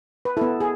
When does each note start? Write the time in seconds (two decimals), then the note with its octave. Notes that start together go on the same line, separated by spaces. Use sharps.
0.25 B4
0.37 B3 E4 A4
0.60 G#4